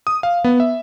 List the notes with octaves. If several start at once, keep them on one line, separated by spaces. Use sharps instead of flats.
D#6
F5
B3
E5